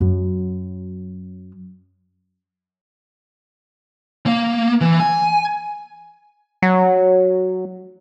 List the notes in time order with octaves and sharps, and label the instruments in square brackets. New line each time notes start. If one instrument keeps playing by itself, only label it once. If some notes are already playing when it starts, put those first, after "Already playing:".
[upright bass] F#2 F#3
[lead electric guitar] A#3
E3
G#5
[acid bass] F#3